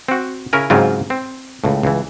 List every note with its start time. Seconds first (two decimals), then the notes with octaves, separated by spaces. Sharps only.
0.08 C4 F#4
0.53 C#3 C#4 E4 A#4 G#5
0.70 G#2 C#3 F#3 C4 F4
1.10 C4
1.64 C#2 A2
1.83 C#2 E3